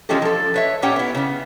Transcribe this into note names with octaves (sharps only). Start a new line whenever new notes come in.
E3 F3 G#3 C#4 G4 A4
F3 A4
B4 C#5 E5
A#2 C#4 G4 C#5 F#5 G5
B3 E4
C#3 B3